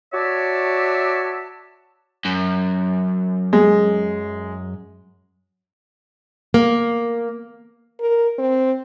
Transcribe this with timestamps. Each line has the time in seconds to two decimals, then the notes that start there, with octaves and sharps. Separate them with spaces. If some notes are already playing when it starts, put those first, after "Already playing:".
0.13 F#4 C#5 D5 E5 A5
2.25 F#2
3.53 G#3
6.54 A#3
8.00 A#4
8.39 C4